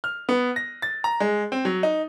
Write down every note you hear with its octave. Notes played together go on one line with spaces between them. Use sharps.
F6
B3
A#6
A6
A#5
G#3
C4
F#3
D#4